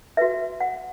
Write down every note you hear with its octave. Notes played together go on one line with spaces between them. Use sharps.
F#4 B4 E5
F#5